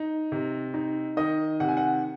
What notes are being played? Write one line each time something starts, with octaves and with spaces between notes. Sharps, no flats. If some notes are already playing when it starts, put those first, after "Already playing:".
Already playing: D#4
C3
D#4
D#3 D#5
C3 F#5
G#5
F#5